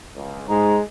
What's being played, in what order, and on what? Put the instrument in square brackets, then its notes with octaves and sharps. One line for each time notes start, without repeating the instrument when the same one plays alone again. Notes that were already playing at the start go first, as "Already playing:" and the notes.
[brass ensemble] C#2
[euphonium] G#2 [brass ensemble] G#3 [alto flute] A#5